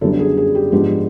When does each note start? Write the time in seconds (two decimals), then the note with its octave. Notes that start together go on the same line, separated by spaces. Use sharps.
0.01 F#2 D3 G3 B3 D4 A4
0.19 G#4
0.37 G#4
0.55 G4
0.72 G#2 F3 G#3 B3 D4 G4